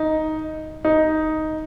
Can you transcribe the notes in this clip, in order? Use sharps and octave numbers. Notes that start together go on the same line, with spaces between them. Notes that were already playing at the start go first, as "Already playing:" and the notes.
Already playing: D#4
D#4